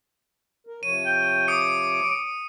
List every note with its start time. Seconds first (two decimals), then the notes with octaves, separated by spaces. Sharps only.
0.67 A#4
0.83 C3 F3 C#5 D#7
1.06 G5
1.48 D6 D#6 C#7